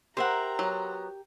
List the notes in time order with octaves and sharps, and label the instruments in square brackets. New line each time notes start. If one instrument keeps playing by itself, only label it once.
[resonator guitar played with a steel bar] G4 A#4 [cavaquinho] C5 E5 F#5 [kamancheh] A#5
[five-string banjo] F#3 B3